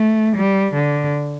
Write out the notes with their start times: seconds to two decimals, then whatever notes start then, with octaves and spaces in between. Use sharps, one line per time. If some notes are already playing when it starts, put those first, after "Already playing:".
Already playing: A3
0.35 G3
0.73 D3